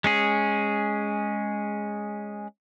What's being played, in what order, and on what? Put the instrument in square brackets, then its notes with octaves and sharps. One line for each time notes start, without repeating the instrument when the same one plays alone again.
[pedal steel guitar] G#3 C#4 G#4